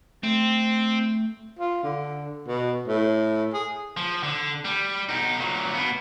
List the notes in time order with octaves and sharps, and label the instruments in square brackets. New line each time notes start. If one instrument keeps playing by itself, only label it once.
[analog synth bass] A3 [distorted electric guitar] C4
[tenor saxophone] F4
D3
B2
A2
G#4
[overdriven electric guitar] F3
D3
G3
B2 D#4
A#2 F#3
B2 B3